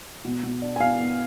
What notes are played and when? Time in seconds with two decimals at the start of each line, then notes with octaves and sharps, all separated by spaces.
0.25 B2
0.43 B2
0.62 D4
0.76 G#5
0.80 B2 F5
0.99 B3